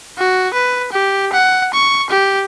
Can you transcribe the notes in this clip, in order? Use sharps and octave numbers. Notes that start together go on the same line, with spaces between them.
F#4
B4
G4
F#5
C#6
G4